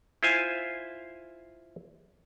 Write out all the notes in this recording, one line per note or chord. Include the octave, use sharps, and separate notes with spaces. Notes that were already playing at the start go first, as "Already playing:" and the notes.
E4 F4 C5 F5 G#5